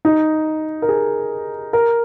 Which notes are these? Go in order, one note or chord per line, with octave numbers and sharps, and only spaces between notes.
D#4
A#4
G#4
A#4